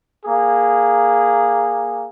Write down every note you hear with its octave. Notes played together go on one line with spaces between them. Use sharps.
A#3 G#4